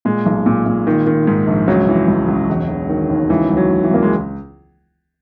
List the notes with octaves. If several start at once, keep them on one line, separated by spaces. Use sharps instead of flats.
A#2 G#3
B1
A#2
A#2
D#3
D#3
G#2
A#1
C#2 F#3
E3
C#2
C#2
E1
E1
D#3
D#2
C#2 E3
C#2
F#3
C#2
E3
C#2 A#3
G#3